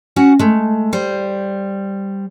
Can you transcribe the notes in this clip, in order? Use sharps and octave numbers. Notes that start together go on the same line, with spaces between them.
C#4 F#4 F#5
G#3 A3
G3 C5